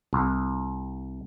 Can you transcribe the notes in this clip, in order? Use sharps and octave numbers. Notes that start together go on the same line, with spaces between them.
C2